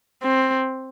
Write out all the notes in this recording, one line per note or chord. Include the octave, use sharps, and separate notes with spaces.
C4